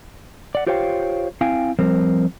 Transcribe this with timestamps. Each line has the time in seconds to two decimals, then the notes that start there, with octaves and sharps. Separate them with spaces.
0.55 D5 F#5
0.67 F4 G4 C5 C#5 F5 G5
1.41 C4 E4 F5 G5 G#5
1.79 F3 G3 C4 A#4 C5